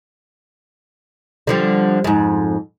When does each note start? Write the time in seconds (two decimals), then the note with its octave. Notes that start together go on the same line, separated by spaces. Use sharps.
1.47 D3 F3 G3
2.04 F2 G#2